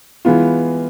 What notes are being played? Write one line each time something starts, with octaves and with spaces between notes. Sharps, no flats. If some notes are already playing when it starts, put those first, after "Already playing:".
E3 G#3 B3 F4